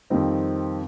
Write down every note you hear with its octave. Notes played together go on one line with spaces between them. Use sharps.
F2 D#3 G3 C4 D#4